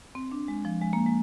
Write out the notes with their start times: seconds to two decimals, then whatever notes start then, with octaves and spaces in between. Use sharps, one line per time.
0.15 C4
0.32 D4
0.48 G#3
0.65 F3
0.82 G#3
0.93 A#3
1.06 G#3